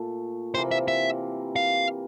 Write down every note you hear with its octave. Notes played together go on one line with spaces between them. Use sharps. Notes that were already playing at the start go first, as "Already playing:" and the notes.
Already playing: A#2 A3
C3 E3 A#3 C5
E5
E5
F5